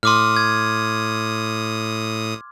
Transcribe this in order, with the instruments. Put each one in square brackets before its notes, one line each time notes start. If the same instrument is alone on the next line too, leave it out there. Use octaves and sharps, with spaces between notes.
[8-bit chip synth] A2 D#6 [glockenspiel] C6 D6 F6
[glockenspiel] G#6